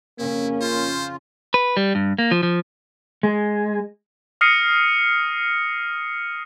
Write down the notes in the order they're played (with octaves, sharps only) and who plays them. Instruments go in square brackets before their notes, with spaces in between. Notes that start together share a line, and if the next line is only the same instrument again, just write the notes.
[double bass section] F2 C#3 C#4 [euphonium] A#3 [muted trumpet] E4
[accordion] F4 [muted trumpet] C5
[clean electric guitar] B4
G3
G2
A#3
F3
F3
[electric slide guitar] G#3
[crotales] D#6 F6 A#6 C7 C#7 D#7